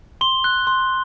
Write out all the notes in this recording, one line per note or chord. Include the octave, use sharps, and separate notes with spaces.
C6 G7
F#6
C6